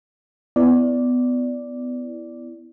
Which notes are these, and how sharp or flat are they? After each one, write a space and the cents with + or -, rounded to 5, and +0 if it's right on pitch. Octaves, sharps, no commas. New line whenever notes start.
B3 +20 E4 +0 D5 -5